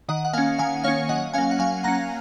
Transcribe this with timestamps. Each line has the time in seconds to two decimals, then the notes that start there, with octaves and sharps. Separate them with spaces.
0.09 D#3 D#5 F#5
0.25 F#5
0.33 A#3 C#4 F5 G#5
0.58 D#3 F5 G#5
0.84 A#3 C#5 F5
0.88 C#4
1.09 F#3 D#5 F#5
1.34 C#4 F5 G#5
1.38 A#3
1.51 F#5
1.59 F#3 F5 G#5
1.84 A#3 C#4 F#5 A#5